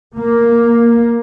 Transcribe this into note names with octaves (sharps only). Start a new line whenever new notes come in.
A#3